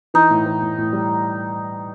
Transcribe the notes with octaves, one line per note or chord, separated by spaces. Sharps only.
E3 D#4
A2
E3
A2
A2
G3